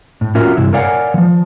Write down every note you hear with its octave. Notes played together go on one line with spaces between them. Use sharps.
A2
C#4 F4 F#4 A#4 E5
G2 C3 E4
A#4 C#5 D5 F5 F#5 G#5
E3 F3